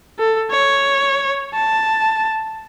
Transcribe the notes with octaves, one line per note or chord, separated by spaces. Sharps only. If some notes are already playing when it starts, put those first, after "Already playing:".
A4
C#5
A5